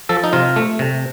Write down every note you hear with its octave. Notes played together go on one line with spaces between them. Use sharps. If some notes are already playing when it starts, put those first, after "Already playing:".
F3 A4
D#4
C3 F4
A3
C3